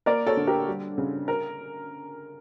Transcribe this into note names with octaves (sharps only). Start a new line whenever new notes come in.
A#3 A#4 D5
A4 C#5
D3
G4 A#4
G3
C#3
A#4